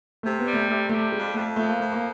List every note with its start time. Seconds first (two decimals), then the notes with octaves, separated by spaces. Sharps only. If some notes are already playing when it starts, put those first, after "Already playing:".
0.23 C3 A3
0.39 B3
0.46 G3
0.53 A3
0.68 C3 A3
0.89 G3 A3
1.12 F2 G#3
1.34 F2 A3
1.56 F3 A3
1.68 A#3
1.78 F2 A3
1.92 A#3